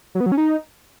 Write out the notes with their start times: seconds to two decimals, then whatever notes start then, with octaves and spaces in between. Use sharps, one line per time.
0.15 F#3
0.21 B3
0.26 F#3
0.32 C#4
0.37 D#4